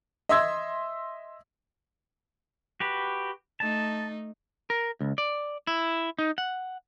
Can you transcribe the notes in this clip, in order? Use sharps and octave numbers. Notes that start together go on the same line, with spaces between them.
D#5 E5 C6 E6 G#6
F#4 G4 B4
A3 D#4 A5
A#4
C#2
D5
E4
D#4
F#5